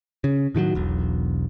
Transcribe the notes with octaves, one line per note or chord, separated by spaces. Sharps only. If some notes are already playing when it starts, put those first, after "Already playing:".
C#3
A2 D#3 F3 F#3
E1 B1